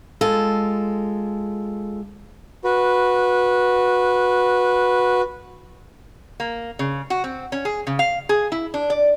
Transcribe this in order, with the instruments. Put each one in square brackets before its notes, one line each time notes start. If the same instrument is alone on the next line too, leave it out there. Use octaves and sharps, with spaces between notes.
[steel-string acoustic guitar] G#3 F4 A4
[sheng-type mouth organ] F#4 B4
[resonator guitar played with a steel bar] A#3
C#3
F#4
C4
C#4
G#4
C#3
F5
G#4
E4
D4
D5